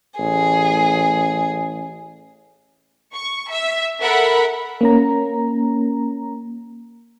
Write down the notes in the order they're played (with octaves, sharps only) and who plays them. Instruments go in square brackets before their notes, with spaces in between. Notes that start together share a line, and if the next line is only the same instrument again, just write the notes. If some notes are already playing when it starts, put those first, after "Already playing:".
[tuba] A1 [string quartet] G#4
[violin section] C#6
E5
A4 A#4 E5 F#5 B5
[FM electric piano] A#3 C#4 A#5